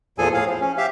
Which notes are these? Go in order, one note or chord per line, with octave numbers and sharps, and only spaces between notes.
E2 A#2 F3 G#4 A4 G#5
A2 G#4 F5
F3
C#4
G4 E5 F5